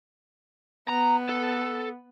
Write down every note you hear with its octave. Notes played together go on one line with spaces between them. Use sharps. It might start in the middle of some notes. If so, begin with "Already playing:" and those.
B3 A#5
A4